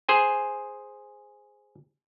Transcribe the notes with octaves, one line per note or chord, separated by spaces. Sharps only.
G#4 C5 G#5